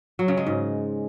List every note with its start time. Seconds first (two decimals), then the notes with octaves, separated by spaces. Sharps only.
0.19 F#3
0.28 C#3
0.37 G#3
0.47 G#2